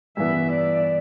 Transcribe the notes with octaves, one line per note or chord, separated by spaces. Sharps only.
G2 E3 B3 E5
D5